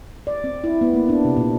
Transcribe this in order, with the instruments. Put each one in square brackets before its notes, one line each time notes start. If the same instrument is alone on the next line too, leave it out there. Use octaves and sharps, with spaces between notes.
[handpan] D5
C4
E4
B3
A#3
D4
C3
A#2